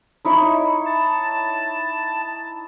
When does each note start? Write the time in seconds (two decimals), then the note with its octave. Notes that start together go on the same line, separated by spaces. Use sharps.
0.25 D#4 E4 C#5
0.86 A5